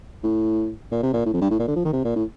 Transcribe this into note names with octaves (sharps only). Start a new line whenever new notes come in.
A2
A#2
C3
A#2
A2
F2
G2
A2
A#2
D3
F3
D#3
C3
A#2
A2